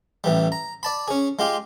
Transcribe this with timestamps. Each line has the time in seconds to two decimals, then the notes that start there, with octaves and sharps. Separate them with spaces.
0.24 A1 E3 G3
0.52 A#5
0.83 D5 A5 B5
1.08 C#4 G#4
1.39 G#3 F4 G4